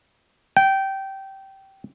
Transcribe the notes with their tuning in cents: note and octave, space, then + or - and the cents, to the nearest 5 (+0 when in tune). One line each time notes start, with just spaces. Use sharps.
G5 -15